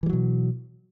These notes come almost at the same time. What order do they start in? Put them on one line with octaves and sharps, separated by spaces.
E3 G3 F#3 B2